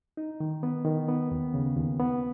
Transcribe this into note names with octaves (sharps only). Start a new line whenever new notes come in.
D#4
D#3
B3
D#3
B3
D#2
C#3
D#2
B3